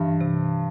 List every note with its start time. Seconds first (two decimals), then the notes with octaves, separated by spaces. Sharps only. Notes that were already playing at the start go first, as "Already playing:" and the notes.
Already playing: G2 E3
0.21 C3